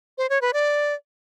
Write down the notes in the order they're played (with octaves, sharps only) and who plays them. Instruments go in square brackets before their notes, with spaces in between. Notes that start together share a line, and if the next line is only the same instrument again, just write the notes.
[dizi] C5
C#5
B4
D5